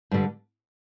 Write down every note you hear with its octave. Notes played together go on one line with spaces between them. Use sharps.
G2 D3 G3